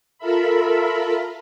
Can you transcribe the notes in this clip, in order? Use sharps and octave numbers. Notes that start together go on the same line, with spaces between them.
F4 A4 A#4 E5 B5